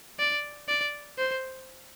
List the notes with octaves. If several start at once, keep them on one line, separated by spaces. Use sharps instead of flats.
D5
D5
C5